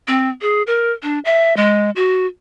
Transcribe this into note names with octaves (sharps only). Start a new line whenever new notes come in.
C4
G#4
A#4
D4
E5
G#3
F#4